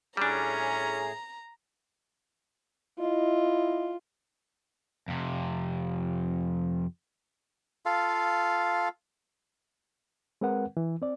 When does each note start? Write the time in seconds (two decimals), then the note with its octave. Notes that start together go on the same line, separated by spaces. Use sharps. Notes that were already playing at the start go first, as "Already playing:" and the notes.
0.17 A2 G3 C#4 D4 G#4 A#5
2.99 E4 F4 D#5
5.08 F2 C3
7.86 F4 A4 F5
10.41 G#3 C4 A#4 B4 F#5
10.77 E3
11.02 C4 D5